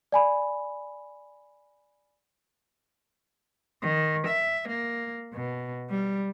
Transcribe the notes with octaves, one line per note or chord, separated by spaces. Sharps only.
D5 G#5 B5
D#3
E5
A#3
B2
G3